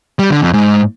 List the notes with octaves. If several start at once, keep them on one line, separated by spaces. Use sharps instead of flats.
G3
D3
F2
G#2